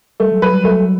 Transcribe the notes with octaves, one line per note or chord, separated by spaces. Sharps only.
G3 A3
F#3
F#3 B4
G3
F#3 A3